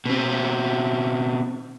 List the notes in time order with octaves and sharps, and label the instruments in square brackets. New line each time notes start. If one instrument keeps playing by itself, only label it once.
[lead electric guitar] B2 C4